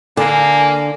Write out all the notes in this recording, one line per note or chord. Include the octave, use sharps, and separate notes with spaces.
D3 A#3 G#5